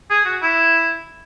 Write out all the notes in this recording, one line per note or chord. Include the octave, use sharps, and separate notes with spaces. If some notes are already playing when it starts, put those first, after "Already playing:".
G#4
F#4
E4